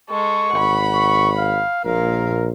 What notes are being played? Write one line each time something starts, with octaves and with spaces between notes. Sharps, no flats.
G#3 A4 C#6
G#1 F#5 B5
C#6
F5
A#1 A#2 A#4 F5